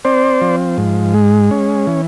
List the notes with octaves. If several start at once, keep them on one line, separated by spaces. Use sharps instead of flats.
C4 C5 D5
F3
G#2
G#3
C#4
E3